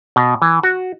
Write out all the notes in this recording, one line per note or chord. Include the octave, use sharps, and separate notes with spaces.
B2
E3
F#4